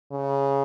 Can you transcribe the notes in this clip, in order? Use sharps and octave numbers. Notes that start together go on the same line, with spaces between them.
C#3